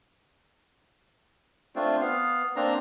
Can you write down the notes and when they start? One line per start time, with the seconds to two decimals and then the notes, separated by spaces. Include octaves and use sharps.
1.76 A3 C4 D4 F4
2.01 B3 F5
2.56 A#3 C4 D4 A#5